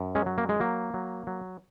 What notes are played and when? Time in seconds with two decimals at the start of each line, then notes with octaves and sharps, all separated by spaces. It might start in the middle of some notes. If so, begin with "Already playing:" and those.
Already playing: F#2
0.15 G#3 C#4
0.26 F#3
0.38 A#3
0.49 G#3
0.60 F#3 A#3
0.94 F#3
1.27 F#3